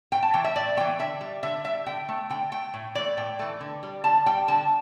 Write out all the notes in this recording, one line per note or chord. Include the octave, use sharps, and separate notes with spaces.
A2 G5
A5
E3 A3 G5
E5
A2 D5
E3 A3 G5
D3 E5
G3
D3 E5
G3 E5
D3 G5
A3
D3 G5
A3 G5
A2
E3 A3 D5
A2 G5
E3 A3
D3
G3
D3 A5
G3 G5
D3 A5